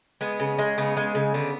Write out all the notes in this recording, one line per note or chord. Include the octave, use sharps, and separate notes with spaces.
G#3 B3
C#3
G#3
C#3 B3
G#3
C#3
D3 B3